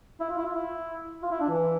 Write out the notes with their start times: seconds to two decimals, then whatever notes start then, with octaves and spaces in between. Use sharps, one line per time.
0.20 E4
0.30 F4
0.37 E4
0.46 F4
0.54 E4
1.23 F4
1.31 E4
1.40 D4
1.49 E3